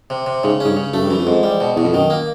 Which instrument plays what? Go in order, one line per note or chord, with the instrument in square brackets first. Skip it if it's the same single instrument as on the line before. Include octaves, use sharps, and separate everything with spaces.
[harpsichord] C3
C3
[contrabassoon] G#2 [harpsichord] C#3
[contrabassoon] G#2 [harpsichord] C#4
[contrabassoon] G2
[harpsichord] C#3
[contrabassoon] F#2 [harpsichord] A3
[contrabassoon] G2
[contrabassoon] F#2 [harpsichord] E3
[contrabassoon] F2
[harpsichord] G#2
G3
B2
[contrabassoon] E2 [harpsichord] B2
[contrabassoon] F2
[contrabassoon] F#2 [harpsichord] D#3
[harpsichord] A#3